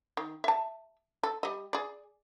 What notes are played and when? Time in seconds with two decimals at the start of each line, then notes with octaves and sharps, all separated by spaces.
0.17 D#3
0.44 E5 A5
1.23 A4
1.43 G3 D#5
1.73 G#4 D5